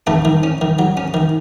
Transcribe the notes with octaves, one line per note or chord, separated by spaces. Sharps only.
D#3 A3 A4
D#3
C#4
D#3
F#3
C#4
D#3